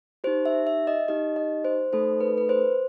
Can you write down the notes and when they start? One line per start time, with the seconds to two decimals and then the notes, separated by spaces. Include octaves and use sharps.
0.24 D#4 G4 C5
0.46 E5
0.67 E5
0.87 D#5
1.08 D#4 G4 D#5
1.36 D#5
1.65 C5
1.93 A3 D#4 A4 C5
2.21 B4
2.38 B4
2.49 C5